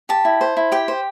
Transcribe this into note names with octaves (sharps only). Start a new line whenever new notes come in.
G4 A5
E4
C5
E4
G4 G5
C5